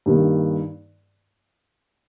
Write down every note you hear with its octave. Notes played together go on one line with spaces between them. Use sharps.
G2 D#3 A#3